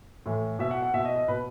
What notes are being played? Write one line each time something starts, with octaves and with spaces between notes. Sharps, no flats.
A2 E3
B2 E5
F#5
F#5
B2 E5
D#5
D#5
B2 B4